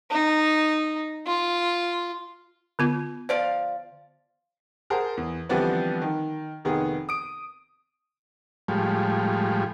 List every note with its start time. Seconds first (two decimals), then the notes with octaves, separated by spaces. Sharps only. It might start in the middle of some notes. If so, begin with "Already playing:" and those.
0.11 D#4
1.27 F4
2.79 D3 B3 F4
3.29 F3 D5 F5
4.90 G#4 A#4 C5 F#5 A5
5.17 E2
5.49 D3 E3 F3 G3 B3 C4
6.02 D#3
6.65 F1 D#3 B3 G#4
7.09 D#6 D7
8.68 A2 F3 G3 G#3